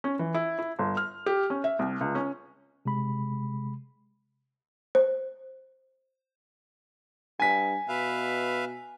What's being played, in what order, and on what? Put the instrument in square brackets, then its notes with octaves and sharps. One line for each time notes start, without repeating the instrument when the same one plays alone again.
[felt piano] C#4
E3
E4
E4
G1
F6
G4
C#4
E5
C2
C#2
C#4
[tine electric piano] C3 G#3 B5
[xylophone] C5
[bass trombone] G2 [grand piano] G#5 B6
[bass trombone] B2 [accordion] B4 E5 F5